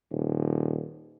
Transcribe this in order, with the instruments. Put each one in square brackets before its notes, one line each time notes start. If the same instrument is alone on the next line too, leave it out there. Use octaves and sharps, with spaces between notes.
[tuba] D#1